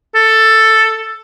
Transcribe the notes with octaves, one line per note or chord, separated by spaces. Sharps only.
A4